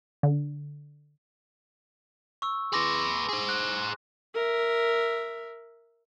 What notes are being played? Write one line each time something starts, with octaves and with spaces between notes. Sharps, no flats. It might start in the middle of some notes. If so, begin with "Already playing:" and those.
D3
C#6 E6
G#4 B4 C6 D6 A#6
G#4 C5
F#6
A#4 E5